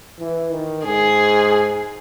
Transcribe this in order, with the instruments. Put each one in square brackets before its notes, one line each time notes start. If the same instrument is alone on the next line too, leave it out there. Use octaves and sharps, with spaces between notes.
[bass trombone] E3
D#3
[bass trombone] G#2 [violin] G#4